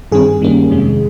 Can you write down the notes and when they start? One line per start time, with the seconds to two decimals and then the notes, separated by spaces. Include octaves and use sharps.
0.12 G2 D#3 G3 C4 G#4
0.40 G2 D#3 G3 A#3 C#4
0.70 F2 C3 D#3 G#3